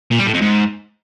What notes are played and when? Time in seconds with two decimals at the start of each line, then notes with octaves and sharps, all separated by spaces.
0.11 A#2
0.19 G3
0.26 A2
0.34 F2
0.42 G#2